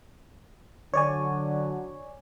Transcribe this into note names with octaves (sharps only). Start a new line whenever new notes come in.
D3 F#3 C#5 D5 G#5